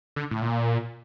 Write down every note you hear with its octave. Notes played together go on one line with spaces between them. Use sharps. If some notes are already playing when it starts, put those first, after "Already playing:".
D3
A2
A#2